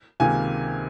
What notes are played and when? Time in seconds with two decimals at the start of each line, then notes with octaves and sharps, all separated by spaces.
0.20 C#2 C3 D#3 A#3 G#5